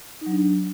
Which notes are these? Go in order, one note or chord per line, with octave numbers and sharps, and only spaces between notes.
D#4
F#3
D4
F#3